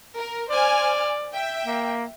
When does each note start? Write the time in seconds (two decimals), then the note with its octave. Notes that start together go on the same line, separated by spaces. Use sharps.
0.16 A#4
0.50 C5 D5 G#5 F6
1.32 E5 G5
1.65 A#3